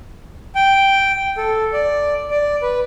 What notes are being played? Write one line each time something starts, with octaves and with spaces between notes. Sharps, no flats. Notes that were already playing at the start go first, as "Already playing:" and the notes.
G5
A4
D5
D5
B4